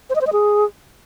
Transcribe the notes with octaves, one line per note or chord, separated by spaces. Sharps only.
C5
D#5
C5
D#5
G#4